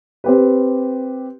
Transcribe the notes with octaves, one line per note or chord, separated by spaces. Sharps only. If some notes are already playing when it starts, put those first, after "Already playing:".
C4 G4 B4